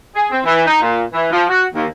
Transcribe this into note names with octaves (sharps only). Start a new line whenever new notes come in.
G#4
C4
E3
D#4
A#2
E3
F3
F#4
D#2